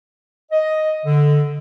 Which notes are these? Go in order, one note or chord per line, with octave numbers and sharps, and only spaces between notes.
D#5
D3